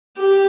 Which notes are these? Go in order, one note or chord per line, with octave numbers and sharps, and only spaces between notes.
G4